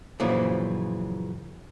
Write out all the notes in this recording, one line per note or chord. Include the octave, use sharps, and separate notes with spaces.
F#2 A#2 C#3 E3 F3